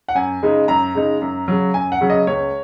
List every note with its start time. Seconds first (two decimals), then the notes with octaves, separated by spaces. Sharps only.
0.08 F#5
0.15 F#2 G#5
0.43 C#3 G#3 D#4
0.68 F#2 A#5
0.95 C#3 G#3 D#4
1.22 F#2
1.48 C#3 F#3
1.74 F#2 G#5
1.92 F#5
2.01 C#3 F#3
2.10 D#5
2.27 C#2 C#5